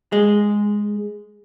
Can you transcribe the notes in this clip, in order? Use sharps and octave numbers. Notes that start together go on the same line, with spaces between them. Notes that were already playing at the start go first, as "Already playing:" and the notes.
G#3